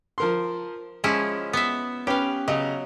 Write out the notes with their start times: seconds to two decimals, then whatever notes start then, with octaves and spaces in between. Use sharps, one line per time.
0.18 F3 A#4 C6
1.04 F3 G#3 C#4 E4
1.53 B3 E5
2.07 C#4 G4 B4 F5 G5
2.48 C#3 F#3 D#5